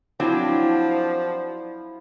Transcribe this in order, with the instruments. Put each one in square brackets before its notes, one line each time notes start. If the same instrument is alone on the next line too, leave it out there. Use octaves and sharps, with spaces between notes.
[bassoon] F3 [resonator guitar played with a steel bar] F#3 C4 D4 [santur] E4